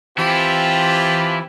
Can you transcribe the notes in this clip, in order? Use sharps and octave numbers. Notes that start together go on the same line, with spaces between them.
E3 C4 E4 F4 G4 A5 B5